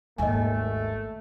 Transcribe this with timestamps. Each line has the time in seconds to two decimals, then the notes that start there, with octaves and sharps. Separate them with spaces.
0.18 G#1 D#2 A3 D#5 G#5